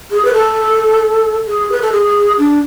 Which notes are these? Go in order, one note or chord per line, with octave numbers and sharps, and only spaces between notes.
G#4
B4
A4
G#4
B4
A4
G#4
D4